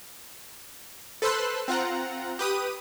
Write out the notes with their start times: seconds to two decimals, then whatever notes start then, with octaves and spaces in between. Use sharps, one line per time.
1.22 A4 B4 C5 C6 E6 F#6
1.68 C4 F4 F#5 A#5
2.39 G4 B4 D#6 D#7